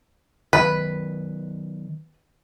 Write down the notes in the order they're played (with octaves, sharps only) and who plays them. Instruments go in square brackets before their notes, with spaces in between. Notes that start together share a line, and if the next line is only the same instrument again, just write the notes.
[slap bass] D#3 F#3 B3 [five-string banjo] B4